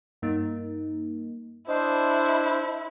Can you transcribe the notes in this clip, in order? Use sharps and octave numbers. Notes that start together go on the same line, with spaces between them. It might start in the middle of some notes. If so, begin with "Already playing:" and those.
G2 A#3 D#4
D4 E4 C5 D#5 C6